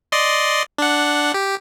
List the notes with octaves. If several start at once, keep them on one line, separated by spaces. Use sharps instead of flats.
D5 D#5 C6
D4 F#5
G4